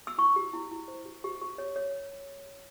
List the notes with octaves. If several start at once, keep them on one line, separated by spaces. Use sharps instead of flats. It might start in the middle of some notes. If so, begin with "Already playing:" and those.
E6
E4 C#6
G4
E4
E4
C5
G4
G4
G4
C#5
C#5